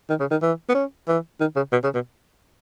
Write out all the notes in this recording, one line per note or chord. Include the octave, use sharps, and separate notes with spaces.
D#3
C#3
D#3
E3
B3
C#4
E3
D#3
C#3
B2
C#3
B2